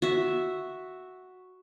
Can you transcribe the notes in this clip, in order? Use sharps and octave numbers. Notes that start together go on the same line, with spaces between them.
F#4 E5